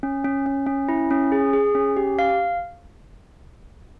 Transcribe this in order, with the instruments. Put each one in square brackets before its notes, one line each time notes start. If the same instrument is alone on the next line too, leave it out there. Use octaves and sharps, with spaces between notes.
[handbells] C#4
C#4
C#4
C#4
E4
C#4
G#4
G#4
C#4
G4
F5